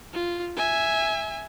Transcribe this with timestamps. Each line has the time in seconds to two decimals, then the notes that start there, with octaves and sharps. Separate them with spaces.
0.13 F4
0.56 E5 G#5